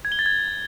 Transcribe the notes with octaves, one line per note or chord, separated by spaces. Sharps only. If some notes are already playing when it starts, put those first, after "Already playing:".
G#6
G7
A6
G#6